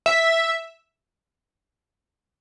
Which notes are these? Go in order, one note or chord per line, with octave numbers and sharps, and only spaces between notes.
E5